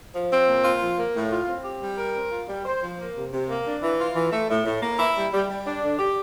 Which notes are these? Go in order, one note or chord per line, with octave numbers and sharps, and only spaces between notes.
F3
C4
A#2
F4
F3
A#3
A2
F4
C4
G4
G3
A#4
C4
F4
G3
C5
F3
A#3
C3
C3
A#3
D4
E3
F4
E3
A3
A2
A2
A#3
E4
G3
G3
G3
D4
D3
G4